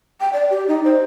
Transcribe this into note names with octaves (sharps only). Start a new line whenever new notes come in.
G5
D5
G4
D#4
C5